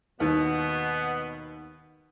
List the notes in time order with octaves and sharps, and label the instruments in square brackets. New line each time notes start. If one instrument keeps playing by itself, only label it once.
[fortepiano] D#2 [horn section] B2 B3